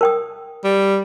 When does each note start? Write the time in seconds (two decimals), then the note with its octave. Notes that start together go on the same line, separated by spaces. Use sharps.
0.01 A#4 G5 D#6
0.64 G3